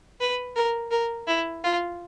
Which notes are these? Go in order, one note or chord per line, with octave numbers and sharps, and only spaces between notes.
B4
A#4
A#4
E4
F4